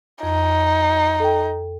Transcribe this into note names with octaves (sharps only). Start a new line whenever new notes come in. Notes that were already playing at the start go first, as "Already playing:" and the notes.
F2 D#4
A4 G5